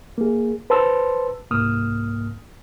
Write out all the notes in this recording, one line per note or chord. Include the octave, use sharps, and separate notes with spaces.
A#3 G#4
B4 C5 A5 C6 E6
C2 G#2 A#3 D#6 F6